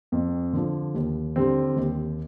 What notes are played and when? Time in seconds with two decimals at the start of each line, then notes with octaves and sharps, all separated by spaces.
0.12 F2
0.53 D3 F3
0.95 D#2
1.36 D3 G3 C4
1.77 D#2